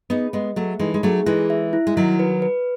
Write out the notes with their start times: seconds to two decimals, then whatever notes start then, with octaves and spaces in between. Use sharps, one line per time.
0.10 B3 D#4 G#4
0.33 G#3 B3 D#5
0.56 F#3 A3 G#4
0.79 E3 G#3 D#4
0.94 G#3
1.03 F#3 A3 G#4
1.26 E3 G#3 E4
1.50 E5
1.73 E4
1.87 G#3
1.96 D#3 F#3 F#4
2.20 B4
2.42 B4